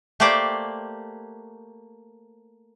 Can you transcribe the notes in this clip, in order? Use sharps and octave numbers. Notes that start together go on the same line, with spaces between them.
A3 A#3 G4 C5 D5